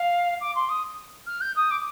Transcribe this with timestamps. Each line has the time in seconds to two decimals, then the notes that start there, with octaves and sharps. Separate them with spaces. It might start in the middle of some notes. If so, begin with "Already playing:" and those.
Already playing: F5
0.41 D6
0.55 C6
0.69 D#6
1.27 F6
1.41 G6
1.56 D#6
1.71 D6